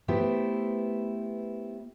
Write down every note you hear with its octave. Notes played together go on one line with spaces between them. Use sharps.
A3 B3 E4 G4 C5